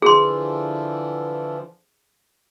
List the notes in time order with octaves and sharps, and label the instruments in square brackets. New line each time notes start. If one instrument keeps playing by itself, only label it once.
[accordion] D3 E3 F3 [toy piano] G#4 C6